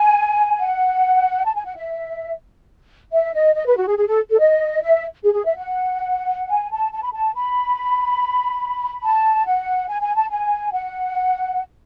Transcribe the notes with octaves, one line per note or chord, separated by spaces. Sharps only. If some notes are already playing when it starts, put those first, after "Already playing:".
Already playing: G#5
F#5
A5
G#5
F#5
E5
E5
D#5
D#5
B4
F#4
G#4
G#4
A4
A4
D#5
E5
G#4
G#4
E5
F#5
G#5
A5
A5
B5
A5
B5
A5
F#5
G#5
G#5
A5
G#5
F#5